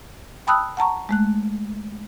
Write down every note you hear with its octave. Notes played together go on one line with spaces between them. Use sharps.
G5 A5 B5 D#6 E6 F#6
F#5 A5 A#5 C#6
G#3 A3 F#6